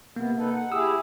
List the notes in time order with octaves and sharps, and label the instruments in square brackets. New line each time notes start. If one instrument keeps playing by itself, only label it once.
[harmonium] C3 B3 [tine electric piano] A#3
[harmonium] D#4 A4 B4
F#5
[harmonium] E4 G4 G#4 [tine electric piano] D#6 E6